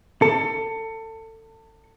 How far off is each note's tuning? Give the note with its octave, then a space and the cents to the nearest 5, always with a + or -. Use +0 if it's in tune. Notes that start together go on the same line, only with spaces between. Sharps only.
A4 +25